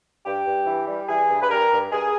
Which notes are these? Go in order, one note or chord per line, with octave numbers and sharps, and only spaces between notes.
G2 G4
G2
E3
G3
E3 G#4
G2
B4
G3 A#4
G2
G2 G#4